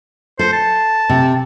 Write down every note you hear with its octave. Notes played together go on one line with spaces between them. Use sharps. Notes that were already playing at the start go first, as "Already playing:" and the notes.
A4 C5
A5
C3